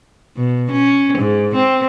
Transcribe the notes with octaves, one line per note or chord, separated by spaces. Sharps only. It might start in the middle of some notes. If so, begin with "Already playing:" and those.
B2
C#4
G#2
C4